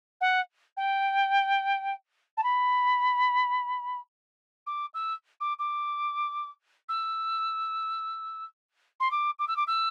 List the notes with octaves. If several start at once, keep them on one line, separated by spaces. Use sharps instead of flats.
F#5
G5
A5
B5
D6
E6
D6
D6
E6
C6
D6
D6
E6
D6
E6